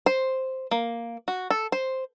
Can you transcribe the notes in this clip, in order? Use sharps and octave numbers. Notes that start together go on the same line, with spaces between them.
C5
A#3
F#4
A4
C5